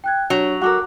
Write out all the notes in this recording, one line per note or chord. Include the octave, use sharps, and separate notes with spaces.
G5 F#6 G#6
F#3 D4 C#5
F#4 A4 A#4 D6 F#6